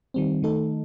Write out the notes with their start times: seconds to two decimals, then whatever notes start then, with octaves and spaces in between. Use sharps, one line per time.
0.14 D#3 G3 C4
0.43 D#3 A3 D#4 A4